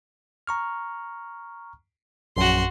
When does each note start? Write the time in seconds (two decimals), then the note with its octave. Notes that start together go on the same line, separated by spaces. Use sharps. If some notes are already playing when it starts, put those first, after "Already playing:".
0.47 A#5 C#6 F6
2.37 A#1 F#2 F#4 C6